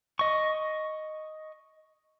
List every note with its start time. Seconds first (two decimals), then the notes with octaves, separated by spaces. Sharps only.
0.19 D#5 C#6